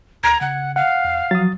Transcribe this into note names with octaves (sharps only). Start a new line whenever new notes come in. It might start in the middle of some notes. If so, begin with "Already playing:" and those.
D2 A#5 G#6
C#3 F#5
F5 F#5
E2
F3 F#3 D#6 A6